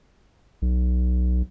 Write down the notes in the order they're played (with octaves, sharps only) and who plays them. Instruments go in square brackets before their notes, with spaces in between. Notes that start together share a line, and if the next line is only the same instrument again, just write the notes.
[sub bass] B1